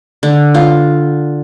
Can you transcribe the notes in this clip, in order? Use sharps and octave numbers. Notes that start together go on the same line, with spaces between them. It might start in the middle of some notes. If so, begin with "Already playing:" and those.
D3
F4